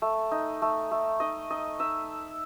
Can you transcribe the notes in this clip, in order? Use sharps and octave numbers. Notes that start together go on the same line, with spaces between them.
A3
D#4
A3
A3
D#4 D#5
D#4 D#5
D#4 E5